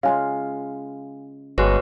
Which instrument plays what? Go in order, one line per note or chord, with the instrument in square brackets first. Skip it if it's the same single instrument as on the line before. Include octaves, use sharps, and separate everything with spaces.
[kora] C#3 G#3 F4 [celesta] F5 G#5
[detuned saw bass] G1 [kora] G#3 F#4 [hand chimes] G#4 B4 C#5